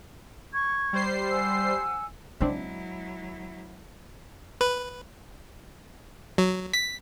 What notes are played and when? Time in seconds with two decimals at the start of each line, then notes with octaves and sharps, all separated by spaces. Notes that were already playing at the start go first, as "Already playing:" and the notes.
0.53 C#6 G#6
0.93 G3 C5 C7
1.30 F#5 G#5 E6
2.40 C#3 F#3 G#3 C4 D4 E4
4.61 B4
6.38 F#3
6.73 B6